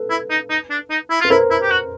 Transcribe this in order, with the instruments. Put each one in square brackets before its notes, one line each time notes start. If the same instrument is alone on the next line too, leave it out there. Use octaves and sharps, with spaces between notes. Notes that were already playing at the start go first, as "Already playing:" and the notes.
Already playing: [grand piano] A4 B4
[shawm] E4
D#4
D#4
D4
D#4
E4
[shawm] F4 [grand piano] B4
[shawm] E4 [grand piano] A#4 C5
[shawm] E4
G4
F#4